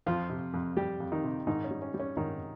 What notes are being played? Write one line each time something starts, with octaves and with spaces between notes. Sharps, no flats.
F2 F3 F4
C3
F2
G3 G4
F2
D#3 D#4
C3
G#2 D#3 D#4
C#4
G3
C#4
G3
C#4
G#2 D#3 D#4